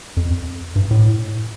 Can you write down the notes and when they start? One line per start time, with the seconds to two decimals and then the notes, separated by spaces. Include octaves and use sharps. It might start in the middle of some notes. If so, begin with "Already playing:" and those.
0.17 F2
0.76 G2
0.91 A2